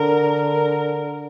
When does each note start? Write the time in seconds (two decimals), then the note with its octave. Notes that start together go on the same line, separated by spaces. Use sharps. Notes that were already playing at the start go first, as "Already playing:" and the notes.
Already playing: D3 A#4
0.41 A#4